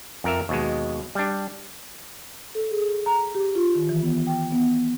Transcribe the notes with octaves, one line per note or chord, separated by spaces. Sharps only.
F2 A#4 E5
D#2 B2 G#3
G3 D4
A4
G#4
A#5
G4
F4
D#3
E3
B3
G5
B3